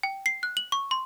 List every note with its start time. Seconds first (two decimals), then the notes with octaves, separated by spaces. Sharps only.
0.03 G5
0.26 C7
0.43 F#6
0.57 F#7
0.72 C#6
0.91 C6